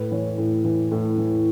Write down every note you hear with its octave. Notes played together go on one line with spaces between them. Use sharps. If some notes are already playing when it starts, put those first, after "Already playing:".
Already playing: A2 B4
E3 C#5
A2
E3
A2
E3